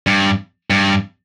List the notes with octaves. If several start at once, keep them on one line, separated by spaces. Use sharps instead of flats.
G2
G2